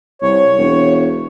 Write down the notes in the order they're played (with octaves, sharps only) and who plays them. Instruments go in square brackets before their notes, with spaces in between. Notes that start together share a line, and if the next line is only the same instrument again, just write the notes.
[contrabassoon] C2 [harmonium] C#5
[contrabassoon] E1